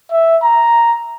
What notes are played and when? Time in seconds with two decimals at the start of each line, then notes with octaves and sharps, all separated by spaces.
0.12 E5
0.43 A#5